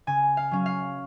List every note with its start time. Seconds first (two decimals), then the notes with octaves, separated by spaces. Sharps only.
0.07 C#3 G#5
0.37 F5
0.51 F#3 C#4
0.66 F5